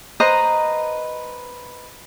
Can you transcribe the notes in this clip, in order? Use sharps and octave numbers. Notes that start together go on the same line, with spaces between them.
B4 C5 D#5 A#5